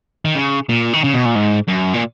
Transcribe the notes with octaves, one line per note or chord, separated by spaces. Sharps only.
D#3
C#3
A#2
D#3
C#3
B2
A#2
G#2
F#2
A#2